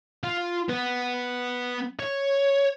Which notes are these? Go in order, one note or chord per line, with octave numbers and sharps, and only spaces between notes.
F4
B3
C#5